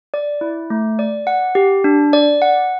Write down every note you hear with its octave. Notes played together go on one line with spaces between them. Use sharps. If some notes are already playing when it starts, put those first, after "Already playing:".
D5
E4
A3
D5
F#5
G4
D4
D5
F#5